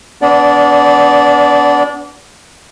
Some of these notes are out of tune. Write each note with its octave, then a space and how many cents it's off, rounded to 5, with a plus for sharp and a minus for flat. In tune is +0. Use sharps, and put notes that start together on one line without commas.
B3 +0 D4 -30 D5 -10